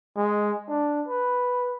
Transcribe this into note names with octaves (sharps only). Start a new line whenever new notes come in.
G#3
D4
B4